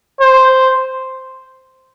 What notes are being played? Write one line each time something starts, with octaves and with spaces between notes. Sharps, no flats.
C5